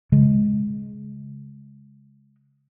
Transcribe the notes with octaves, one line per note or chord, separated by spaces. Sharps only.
C#3 G#3